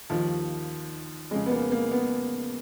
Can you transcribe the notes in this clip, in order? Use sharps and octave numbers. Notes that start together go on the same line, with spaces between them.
D#2 D#3 F3
F2 C#3 G#3
B3
A#3
A#3
B3